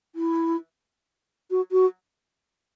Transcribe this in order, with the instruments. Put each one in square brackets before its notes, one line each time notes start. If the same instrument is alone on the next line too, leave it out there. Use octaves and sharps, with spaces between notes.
[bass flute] E4
F#4
F#4